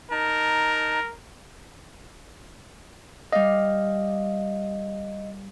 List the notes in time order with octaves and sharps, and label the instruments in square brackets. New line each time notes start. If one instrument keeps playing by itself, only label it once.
[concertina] D#4 A5 [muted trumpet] A#4
[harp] G3 F5 [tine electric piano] D#5